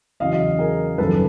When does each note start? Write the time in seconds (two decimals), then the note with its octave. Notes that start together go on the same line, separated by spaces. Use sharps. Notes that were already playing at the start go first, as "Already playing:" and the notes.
0.20 E2 C#3 F#3 D#5 F5
0.33 D#5 F5
0.59 G#4 A#4
0.98 G#1 F#2 C#3 F3 A4 B4